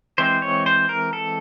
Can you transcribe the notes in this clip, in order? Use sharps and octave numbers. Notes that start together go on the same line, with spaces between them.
E3 G#3 C4 C5
C#5
C5
A#4
A4